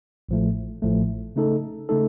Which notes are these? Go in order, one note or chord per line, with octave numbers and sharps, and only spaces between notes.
A1 A2 F3 A3
A1 A2 F3 A3
C#3 A3 D#4 A4
C#3 A3 D#4 A4